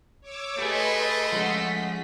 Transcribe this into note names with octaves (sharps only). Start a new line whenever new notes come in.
C#5 D6 E6
A3 G4 G#4 B4 D#5 C6
F3 G#3 C#4 F#5 B6